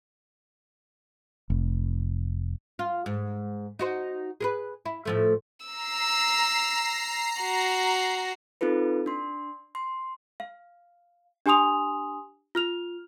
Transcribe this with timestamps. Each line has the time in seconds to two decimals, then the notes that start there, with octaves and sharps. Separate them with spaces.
1.50 F1
2.79 F4
3.06 G#2
3.79 D#4 F#4 C5
4.40 G#4 A#4 B4
4.85 E4
5.05 A2 F3 A3
5.66 A#5 E6 C7
7.42 F#4
8.61 C4 D#4 F4 A4 B4
9.06 D4 C6
9.75 C6
10.40 F5
11.46 D4 G4 G#5 C6 D#6 F7
12.55 F4 F6 F7